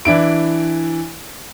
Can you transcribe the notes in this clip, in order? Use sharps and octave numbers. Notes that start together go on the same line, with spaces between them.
E3 D4 E4 D7